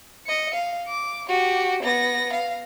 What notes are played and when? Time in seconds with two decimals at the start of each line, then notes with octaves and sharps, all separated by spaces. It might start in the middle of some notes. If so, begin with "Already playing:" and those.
0.26 D#5 C#7
0.54 F5
0.88 D6
1.29 F#4 G4
1.83 B3 A#6
2.33 F5